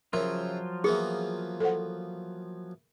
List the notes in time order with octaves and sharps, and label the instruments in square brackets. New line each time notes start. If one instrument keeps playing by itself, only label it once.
[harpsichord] C#3 E4 [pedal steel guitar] F3 F#3 F4 [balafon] A#4
[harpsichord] E3 A#3 B3 [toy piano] G#4
[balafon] A4 C5 F#5